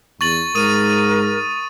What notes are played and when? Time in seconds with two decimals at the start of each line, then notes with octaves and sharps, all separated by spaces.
0.21 E2 C#6 A6 F#7
0.55 G#2 A#4 D#6 D#7